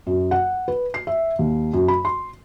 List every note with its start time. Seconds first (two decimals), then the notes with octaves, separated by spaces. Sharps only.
0.07 F#2
0.31 F#5
0.68 B4
0.94 C7
1.07 E5
1.39 D#2
1.73 F#2
1.88 B5
2.05 C6